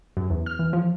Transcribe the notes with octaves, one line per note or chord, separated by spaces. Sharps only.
F#2
E2
F6
E3
F3